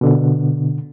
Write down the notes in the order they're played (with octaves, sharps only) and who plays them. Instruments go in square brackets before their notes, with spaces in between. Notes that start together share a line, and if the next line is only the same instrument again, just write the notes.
[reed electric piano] B2 D3